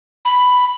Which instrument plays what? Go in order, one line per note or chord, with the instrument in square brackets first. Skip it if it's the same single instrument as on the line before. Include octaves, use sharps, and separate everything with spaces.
[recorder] B5